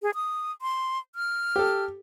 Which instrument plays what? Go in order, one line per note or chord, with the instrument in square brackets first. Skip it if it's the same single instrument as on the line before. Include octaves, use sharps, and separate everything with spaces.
[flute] G#4
D#6
C6
F6
[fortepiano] G4 A4